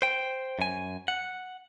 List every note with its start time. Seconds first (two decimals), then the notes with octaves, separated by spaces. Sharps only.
0.02 C5 G5
0.59 F#2 G#5
1.08 F#5